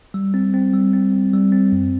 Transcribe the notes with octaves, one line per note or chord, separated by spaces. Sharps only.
G3
C4
C4
G3
C4
C4
G3
C4
F#2